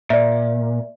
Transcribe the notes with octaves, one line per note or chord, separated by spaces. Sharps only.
A#2 D5 E5